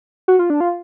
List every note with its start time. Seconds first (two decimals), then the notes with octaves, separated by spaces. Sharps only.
0.28 F#4
0.39 F4
0.50 D4
0.60 F4